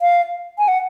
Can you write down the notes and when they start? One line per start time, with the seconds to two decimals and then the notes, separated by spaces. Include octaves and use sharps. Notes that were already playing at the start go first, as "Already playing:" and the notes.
0.02 F5
0.58 G#5
0.68 F#5